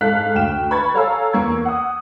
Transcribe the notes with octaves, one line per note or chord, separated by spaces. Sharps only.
G#2 A4 F5 F#6 B6
D2 G5 F6 E7
B4 B5 C#6 G#6 A6
A4 C#5 F5 G#5 A#5 E6
E2 A#3 C#6 G#6
F#5 D#6